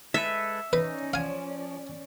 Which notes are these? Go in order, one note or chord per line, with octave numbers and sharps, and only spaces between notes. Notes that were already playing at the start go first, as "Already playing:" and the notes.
G#3 A4 B4 E5
C#4 D#4 B4 D5
F3 F5 G#5